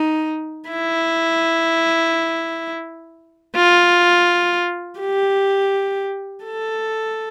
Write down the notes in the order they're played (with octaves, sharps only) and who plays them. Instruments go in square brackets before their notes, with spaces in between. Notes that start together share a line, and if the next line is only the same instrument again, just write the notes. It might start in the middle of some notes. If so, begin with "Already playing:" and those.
Already playing: [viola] D#4
E4
F4
G4
A4